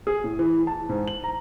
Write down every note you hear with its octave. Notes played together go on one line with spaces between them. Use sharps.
G#4
A2
E3
A5
G#2
F#7
A#5